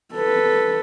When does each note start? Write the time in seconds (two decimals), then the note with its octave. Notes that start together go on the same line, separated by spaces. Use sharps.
0.14 A4 B4